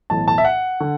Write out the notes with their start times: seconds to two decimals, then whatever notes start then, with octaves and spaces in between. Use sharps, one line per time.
0.10 B1 A2 E3 A5
0.28 A5
0.38 E5
0.45 F#5
0.80 D3